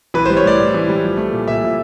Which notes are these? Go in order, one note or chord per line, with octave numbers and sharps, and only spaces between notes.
E3 B4
G3 C5
C#5
A2 D5
A2
E3
G3
F3
A3
A#2
A#2 E5
F3